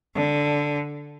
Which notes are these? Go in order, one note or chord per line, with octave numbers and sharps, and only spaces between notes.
D3